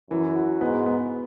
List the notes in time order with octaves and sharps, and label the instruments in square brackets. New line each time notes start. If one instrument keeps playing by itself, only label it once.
[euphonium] F#2 [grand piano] E3
[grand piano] F#4
[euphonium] G#2 [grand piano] B3
[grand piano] B3